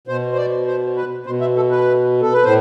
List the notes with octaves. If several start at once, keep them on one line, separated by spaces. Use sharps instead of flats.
B2 C5
C5
D5
C5
B4
B2 C5
E5
A4
B4
A4
B4
A2 C5